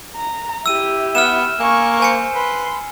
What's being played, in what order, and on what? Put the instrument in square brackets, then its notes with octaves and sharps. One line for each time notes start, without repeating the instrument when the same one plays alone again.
[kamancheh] A#5
[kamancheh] E4 G4 [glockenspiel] E6 D#7
[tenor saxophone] B3 [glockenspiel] F6 E7
[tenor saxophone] A#3 [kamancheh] G#5 C#6
[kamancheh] C5 [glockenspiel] G#5 C#7
[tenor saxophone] B4 [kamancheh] C6